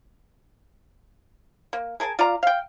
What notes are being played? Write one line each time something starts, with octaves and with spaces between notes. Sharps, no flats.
A#3
G#4 A#4 G#5 A5
F4 D5 F5 A#5
F5 G5